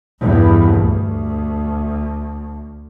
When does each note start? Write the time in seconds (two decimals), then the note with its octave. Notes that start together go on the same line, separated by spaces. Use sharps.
0.20 E2 G2
0.73 D2